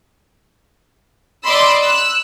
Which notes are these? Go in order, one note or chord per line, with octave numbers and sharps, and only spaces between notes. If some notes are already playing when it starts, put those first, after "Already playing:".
D5 D#5 B5 C6 D6 E6
E6 F#6